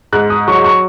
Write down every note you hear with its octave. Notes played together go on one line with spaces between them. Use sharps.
G#2 F#6
D#6
F#3 C#6
C#6